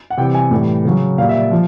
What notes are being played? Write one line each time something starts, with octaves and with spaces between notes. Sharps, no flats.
F#5
C3 E3 G3 G5
G#5
A2 E3 G3
C#3 F#3
A#2 G3 F5
E5
D5
F3